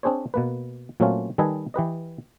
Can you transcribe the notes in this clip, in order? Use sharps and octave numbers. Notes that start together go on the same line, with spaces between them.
C4 D4 G#4 C5 C#5
B2 A#3 B4
A#2 F#3 A3 C4 C#4 F4
D#3 G3 A4 B4 D#5 G#5
E3 G4 B4 D#5